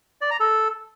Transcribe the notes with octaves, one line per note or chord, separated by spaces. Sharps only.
D5
A#5
A4